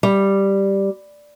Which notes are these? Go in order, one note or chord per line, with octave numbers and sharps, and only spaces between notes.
G3